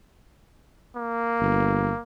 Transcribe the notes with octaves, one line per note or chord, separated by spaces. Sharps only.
A#3
G1